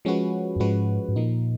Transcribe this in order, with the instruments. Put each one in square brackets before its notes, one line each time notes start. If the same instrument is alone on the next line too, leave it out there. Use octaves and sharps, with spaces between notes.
[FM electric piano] F3 G#3 C#4 F#4 B4
[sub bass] F#2
[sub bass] G#2 [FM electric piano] F3 G#3 C#4 F#4 B4
[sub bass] G#2
[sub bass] A#2 [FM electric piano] F3 A#3 D#4